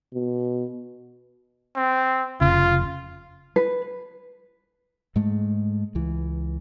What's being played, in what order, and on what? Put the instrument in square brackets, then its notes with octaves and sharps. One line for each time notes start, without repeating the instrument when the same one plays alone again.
[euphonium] B2
[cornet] C4
[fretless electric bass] F1 C#3 [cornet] F4
[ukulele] B4
[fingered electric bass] G#2 G#3 A3
C#2 E3